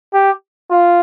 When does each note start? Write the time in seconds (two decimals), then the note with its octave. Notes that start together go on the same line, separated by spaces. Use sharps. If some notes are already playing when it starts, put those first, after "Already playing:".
0.14 G4
0.71 F4